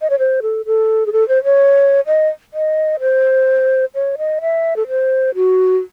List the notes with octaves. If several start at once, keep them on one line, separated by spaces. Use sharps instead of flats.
D#5
C#5
C5
A4
A4
G#4
A4
C5
C#5
D#5
D#5
C5
C#5
D#5
E5
A4
C5
F#4